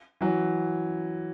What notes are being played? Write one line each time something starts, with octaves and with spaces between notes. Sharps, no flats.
E3 F#3